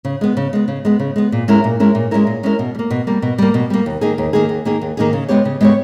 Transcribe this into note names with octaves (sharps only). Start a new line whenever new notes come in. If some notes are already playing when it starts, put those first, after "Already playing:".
C#3
G#3 B3
C#3
G#3 B3
C#3
G#3 B3
C#3
G#3 B3
A#2
G#3 C#4 E4 A#4
A#2
G#3 C#4 E4 A#4
A#2
G#3 C#4 E4 A#4
A#2
G#3 C#4 E4 A#4
B2
G3
A#3
B2
G3 A#3
B2
G3 A#3
B2
G3 A#3
D#2
D#3 A#3 D#4 G#4
D#2
D#3 A#3 D#4 G#4
D#2
D#3 A#3 D#4 G#4
D#2
D#3 A#3 D#4 G#4
C#3
G#3 B3 G4 C#5
C#3
G#3 B3 G4 C#5